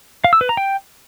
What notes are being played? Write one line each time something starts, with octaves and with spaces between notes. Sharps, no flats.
F5
E6
B4
A#5
G5